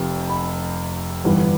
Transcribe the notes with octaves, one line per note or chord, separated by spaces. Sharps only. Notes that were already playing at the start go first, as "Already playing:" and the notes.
Already playing: F1 F2 C3
B5
G1 G2 E3